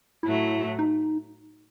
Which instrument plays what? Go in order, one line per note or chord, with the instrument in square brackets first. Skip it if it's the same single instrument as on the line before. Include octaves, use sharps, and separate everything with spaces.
[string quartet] A2 F#3 A3 [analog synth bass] E4
[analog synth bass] D#4